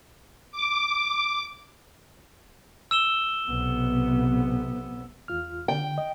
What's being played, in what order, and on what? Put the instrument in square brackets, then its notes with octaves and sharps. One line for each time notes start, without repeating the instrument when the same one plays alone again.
[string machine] D6
[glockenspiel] E6 E7 G7
[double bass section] B1 C3 B3
[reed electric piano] E2 F4 F6
[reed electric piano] D3 [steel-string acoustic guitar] G5
[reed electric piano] D#5